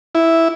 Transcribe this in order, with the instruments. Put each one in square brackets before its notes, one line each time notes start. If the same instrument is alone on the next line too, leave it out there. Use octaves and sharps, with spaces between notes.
[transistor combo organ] E4